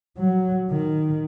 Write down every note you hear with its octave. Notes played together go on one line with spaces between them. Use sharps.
F#3
D#3